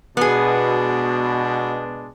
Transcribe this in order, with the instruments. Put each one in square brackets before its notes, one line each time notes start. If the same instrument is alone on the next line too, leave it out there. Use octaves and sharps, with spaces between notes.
[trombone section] B2 [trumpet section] G#3 D4 [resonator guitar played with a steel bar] B3 G#4